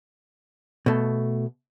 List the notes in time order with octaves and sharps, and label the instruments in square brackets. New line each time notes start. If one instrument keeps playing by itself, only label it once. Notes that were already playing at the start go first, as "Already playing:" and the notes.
[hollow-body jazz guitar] B2 A3